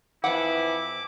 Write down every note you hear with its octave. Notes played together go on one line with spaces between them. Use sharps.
F2 E3 F3 E4 F#5 D6